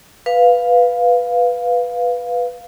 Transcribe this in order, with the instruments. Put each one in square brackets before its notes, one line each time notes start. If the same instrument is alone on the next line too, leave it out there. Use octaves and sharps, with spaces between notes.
[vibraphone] B4 F5